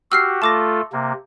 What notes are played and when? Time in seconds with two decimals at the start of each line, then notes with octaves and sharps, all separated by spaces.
0.12 F#4 G4 E6 F6 C7
0.42 A3 F4 A4 A5 D6 A#6
0.93 C3 A#3